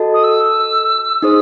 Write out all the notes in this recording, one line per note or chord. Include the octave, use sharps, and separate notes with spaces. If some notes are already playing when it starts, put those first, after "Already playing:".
Already playing: F#4 A4 D#5 A5
D#6
E6
D#4 G#4 C5 D#6